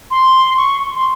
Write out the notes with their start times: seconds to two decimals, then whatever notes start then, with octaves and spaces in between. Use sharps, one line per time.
0.11 C6
0.57 C#6
0.95 C6